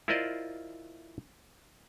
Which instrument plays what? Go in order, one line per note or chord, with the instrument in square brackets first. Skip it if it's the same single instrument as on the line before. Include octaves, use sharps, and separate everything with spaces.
[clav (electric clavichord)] E4 F4 A#4 C5 D5 D#5